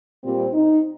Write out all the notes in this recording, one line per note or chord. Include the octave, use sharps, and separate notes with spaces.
A#2 G3 C4
D#4